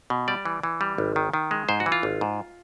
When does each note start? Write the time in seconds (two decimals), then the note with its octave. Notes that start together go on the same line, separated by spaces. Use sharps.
0.10 B2
0.28 G3 D5
0.45 E3
0.63 E3
0.81 G3
0.98 G#1
1.16 D#3
1.34 D#3
1.51 G#3
1.69 G#2 C5
1.80 F#4
1.86 E3
1.92 F4
2.03 G#1
2.21 G#2